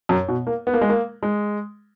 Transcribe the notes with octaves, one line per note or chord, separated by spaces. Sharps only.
F#2
B2
A#3
B3
A#3
G#3
A#3
G#3